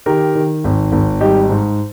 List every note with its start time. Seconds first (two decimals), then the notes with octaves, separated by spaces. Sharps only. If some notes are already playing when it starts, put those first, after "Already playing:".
0.06 D#3 G4 A#4
0.35 D#3
0.64 G#1
0.92 G#1
1.21 G3 D#4 G4
1.50 G#2